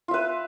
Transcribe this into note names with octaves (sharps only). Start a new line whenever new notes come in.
F4 B4 E5